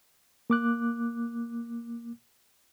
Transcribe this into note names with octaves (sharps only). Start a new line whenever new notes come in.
A#3 D6 F#6